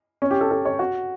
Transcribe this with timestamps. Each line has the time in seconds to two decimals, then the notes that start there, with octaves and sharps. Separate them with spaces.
0.22 C#4
0.31 G4
0.41 A4
0.51 A4
0.65 C#5
0.79 F#4